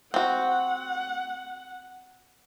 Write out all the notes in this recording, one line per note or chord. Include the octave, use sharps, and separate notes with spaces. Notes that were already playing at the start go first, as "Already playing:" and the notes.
C4 F#4 F#5